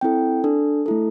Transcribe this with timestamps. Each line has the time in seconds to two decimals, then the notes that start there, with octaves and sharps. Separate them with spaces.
0.01 C4 E4 A4 G5
0.44 D4 A4
0.86 A3 E4 A4